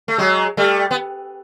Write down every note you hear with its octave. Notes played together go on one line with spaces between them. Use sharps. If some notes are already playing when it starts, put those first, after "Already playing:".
A3
F#3 G#3
G3 A3
B3